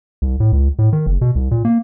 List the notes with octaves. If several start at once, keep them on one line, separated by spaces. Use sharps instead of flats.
C2
A2
C#2
A2
D#3
F#1
B2
C2
A#2
A#3